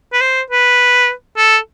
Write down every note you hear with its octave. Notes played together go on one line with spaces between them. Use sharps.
B4
C5
B4
A4